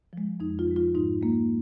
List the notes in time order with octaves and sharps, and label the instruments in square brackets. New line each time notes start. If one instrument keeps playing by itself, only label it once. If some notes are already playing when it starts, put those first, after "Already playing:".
[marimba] F3 G#3
F2 D#4
F4
F3 G#3
F4
G#2 D#4
G#3 A#3